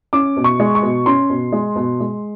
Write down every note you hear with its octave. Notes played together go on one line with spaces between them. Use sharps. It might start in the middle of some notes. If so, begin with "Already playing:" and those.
C#4 D6
B2
C#6
G#3
C#6
B2
C#4 C6
B2
G#3
B2
G#3